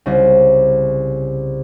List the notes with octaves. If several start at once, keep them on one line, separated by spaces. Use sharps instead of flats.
C2 C#3